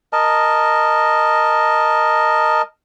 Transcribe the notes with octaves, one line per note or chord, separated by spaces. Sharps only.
A#4 D#5 A5